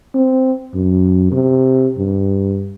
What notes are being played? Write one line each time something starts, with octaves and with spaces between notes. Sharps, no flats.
C4
F#2
C3
G2